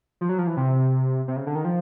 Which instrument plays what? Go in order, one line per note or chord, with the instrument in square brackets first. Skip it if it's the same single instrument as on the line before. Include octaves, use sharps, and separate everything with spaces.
[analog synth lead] F3
F#3
F3
E3
C3
C3
C#3
D3
D#3
F3